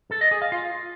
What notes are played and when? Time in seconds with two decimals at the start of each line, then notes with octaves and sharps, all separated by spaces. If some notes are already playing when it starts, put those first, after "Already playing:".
0.11 A4
0.21 D#5
0.31 G#4
0.42 F5
0.52 F4